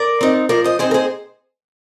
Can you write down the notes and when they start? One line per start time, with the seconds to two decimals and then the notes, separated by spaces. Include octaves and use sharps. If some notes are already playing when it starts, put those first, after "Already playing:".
Already playing: A#4 D5
0.21 C4 D#4
0.49 F3 A#4 D5
0.64 C5 D#5
0.79 C4 D#4 G#4 C5
0.91 A#4
0.94 G#4 C5